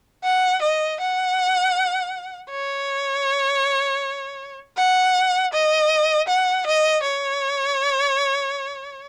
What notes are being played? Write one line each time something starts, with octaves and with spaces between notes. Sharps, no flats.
F#5
D#5
F#5
C#5
F#5
D#5
F#5
D#5
C#5